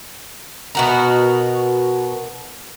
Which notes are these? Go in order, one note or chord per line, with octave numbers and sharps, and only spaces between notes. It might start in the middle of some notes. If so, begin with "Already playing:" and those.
B2 F#4 A#4